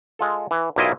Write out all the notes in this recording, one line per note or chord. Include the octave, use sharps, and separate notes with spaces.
G#3 F4 A4
E3
B1 A#2 A#3 E4 F4 D#5